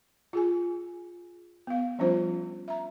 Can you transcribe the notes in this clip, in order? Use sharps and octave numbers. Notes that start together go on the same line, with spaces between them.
F4 G#4 G#5
B3 F5
F3 G3 C#4 D4 F4 C5
E5 A#5